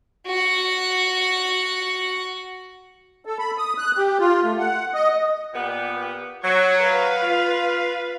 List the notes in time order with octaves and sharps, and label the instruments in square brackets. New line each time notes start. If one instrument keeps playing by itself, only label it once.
[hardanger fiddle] F#4 F#5
[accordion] A4
B5
D#6
F#6
G4
F4
A3
F#5
D#5
[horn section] A#2 B3 G4
[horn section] F#3 [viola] C#5
[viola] B4 F5
[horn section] F4